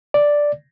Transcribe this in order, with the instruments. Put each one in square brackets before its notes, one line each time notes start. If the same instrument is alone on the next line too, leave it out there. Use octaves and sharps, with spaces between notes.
[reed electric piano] D5